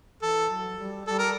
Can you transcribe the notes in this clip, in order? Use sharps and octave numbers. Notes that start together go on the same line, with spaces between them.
E3 A4
F#3
G3
G3 A4
A#4